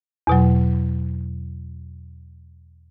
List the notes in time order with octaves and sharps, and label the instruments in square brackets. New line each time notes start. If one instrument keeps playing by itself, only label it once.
[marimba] E2 B2 F#3